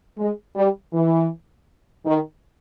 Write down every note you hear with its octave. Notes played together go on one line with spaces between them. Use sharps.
G#3
G3
E3
D#3